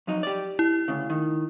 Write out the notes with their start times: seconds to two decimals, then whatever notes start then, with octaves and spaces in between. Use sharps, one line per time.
0.07 F2 F#3 D#4
0.23 G4 D5
0.59 E4
0.88 D2 C#3
1.10 D#3